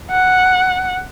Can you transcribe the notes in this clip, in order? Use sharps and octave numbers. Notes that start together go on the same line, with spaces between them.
F#5